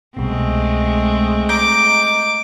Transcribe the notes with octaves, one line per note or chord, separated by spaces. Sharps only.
C2 B2 G#3 A3 C4
D#5 A#5 D6 G6